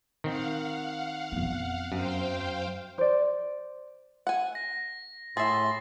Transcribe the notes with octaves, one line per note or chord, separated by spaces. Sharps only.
D#3 C4 F5 F#5
F2 B3
F#2 C5 F5 G5
C5 D5
F#5 G#5
A#6
A2 G#4 E5 C6 A6